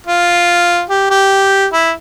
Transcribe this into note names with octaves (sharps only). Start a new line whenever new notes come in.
F4
G4
G4
E4